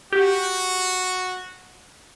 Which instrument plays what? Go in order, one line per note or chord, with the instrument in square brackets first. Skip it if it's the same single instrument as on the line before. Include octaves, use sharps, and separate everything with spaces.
[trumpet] F#4 [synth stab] G4